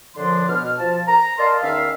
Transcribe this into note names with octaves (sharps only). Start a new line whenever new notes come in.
F#2 D3 F3 D4 C6
B2 F6
F3 A5
A#5
A#4 D5 D#5 F5 A5 C6
E2 D#3 C#4 E5 F5